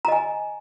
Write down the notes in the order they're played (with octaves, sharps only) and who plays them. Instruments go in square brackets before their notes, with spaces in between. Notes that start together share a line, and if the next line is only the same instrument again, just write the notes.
[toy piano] A#5
D#5
G#5